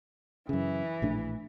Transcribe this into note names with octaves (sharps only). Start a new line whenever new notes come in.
F#2 C#3 E3
A#1 A2 D4